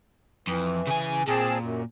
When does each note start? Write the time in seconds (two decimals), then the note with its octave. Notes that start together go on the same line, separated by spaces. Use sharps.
0.47 F2 E3
0.87 C#3 G#5
1.27 A#2 C4 G#4 A5
1.60 F#2